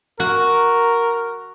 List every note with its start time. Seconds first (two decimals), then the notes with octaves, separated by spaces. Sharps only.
0.20 F#4 A#4